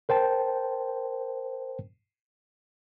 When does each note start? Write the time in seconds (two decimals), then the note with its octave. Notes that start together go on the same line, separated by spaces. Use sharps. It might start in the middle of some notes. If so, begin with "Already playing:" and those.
0.09 A#4 C5 G5 A5